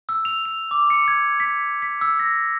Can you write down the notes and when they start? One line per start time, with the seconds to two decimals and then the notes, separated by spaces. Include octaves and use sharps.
0.09 E6
0.25 F7
0.45 F7
0.71 D6
0.90 C#7
1.08 G#6
1.40 B6
1.82 B6
2.01 E6
2.20 A#6